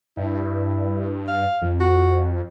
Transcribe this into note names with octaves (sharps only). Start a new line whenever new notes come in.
G2 E4
F5
F2
F#4